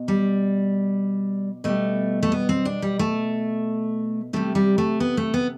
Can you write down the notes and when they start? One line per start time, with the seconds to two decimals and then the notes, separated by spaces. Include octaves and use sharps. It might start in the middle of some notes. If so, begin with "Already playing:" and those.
Already playing: B2
0.08 G3
1.64 B2 G3 A3
2.23 A3
2.32 B3
2.49 C4
2.65 D4
2.82 G3
2.99 A3
4.33 C3 G3 A3
4.55 G3
4.78 A3
5.00 B3
5.17 A3
5.34 B3